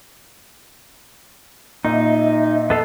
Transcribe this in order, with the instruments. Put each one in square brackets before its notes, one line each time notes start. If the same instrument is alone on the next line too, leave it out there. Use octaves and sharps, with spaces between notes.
[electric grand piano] A#2 [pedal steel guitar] D#4 [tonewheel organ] D#5 E5
[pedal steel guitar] B3 A4 F5